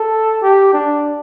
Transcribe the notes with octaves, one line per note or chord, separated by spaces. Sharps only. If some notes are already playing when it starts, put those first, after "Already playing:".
Already playing: A4
G4
D4